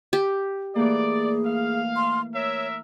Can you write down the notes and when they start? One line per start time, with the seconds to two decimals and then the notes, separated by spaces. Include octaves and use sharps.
0.13 G4
0.75 E3 A3 A#3 G#4 D5
1.46 F5
1.96 C6
2.35 A#4 C#5 E5